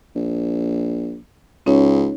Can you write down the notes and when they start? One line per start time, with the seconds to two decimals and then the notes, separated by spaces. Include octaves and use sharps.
0.16 A#1
1.66 C#2 C#4 D#4 C#5